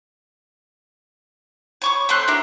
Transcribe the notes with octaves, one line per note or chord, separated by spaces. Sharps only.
C#5 C#6 D6
A3 C4 C6 F#6
D4 F#4 A#4 E5